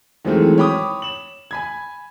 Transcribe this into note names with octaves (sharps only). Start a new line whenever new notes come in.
D#3 E3 F#3 G#3 A3 C4
C#5 G5 B5 D6 D#6
E7 F#7
G#5 B5 G#6